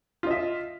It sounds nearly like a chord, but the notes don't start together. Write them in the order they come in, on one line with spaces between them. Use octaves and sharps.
F4 D#5 E5